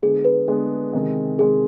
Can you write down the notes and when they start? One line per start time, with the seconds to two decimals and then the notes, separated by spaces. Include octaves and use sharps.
0.02 D3 G#3 B3 D4 G#4
0.25 B4
0.47 D3 G#3 B3 D4 G#4
0.93 C3 D#3 G#3
1.39 C3 D#3 G#3 G#4